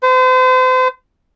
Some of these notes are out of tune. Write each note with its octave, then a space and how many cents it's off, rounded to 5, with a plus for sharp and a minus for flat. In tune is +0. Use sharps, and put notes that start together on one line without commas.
C5 -40